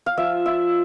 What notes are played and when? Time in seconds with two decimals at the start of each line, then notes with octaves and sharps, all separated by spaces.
0.06 F5
0.17 F3 E5
0.46 F4 E5